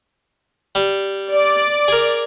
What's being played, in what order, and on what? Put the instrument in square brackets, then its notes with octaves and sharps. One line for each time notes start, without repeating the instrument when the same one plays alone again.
[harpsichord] G3
[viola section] D5
[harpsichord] G#4 A#4